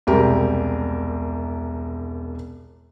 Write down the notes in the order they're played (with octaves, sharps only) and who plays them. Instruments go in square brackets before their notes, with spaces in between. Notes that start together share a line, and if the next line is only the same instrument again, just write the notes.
[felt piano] E1 C2 G4 A#4